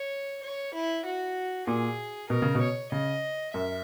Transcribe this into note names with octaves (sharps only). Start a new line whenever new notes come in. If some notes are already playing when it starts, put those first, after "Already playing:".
Already playing: C#5
C#5
E4
F#4
A#2 G#4
B2 A#4
C#3
B2
C#5
C#3 D#5
F#2 E5